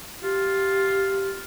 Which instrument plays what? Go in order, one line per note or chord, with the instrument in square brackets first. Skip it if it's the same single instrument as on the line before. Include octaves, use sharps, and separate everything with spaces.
[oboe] F4 [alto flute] G4